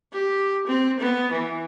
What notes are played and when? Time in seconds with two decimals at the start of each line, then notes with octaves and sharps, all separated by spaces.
0.13 G4
0.67 C4
0.99 B3
1.31 E3